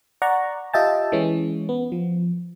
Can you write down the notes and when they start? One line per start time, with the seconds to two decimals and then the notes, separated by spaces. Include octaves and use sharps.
0.22 D5 F#5 A#5 C#6
0.74 F4 G4 D#5 E5 G5 A5
1.12 E3 G#3 C#4
1.69 B3
1.92 F3